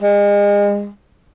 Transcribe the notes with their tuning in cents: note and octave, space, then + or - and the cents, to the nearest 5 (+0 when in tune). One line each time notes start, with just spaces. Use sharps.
G#3 -35